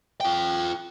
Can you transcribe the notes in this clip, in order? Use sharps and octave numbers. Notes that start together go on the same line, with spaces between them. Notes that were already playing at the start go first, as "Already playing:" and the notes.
F4 G5